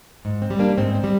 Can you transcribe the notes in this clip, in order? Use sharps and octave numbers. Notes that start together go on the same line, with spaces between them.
G#2
C4
G3
A#3 D4
G#2 C4
C4
G3